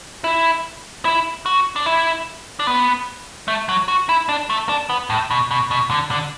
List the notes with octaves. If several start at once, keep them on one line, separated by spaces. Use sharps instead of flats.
E4
E4
F#4
D4
E4
D4
B3
A3
F#3
F#4
E4
D4
A3
D4
B3
A2
B2
B2
B2
D3
D3